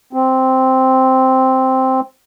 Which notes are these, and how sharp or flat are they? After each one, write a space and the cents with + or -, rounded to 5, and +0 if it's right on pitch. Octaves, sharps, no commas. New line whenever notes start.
C4 +0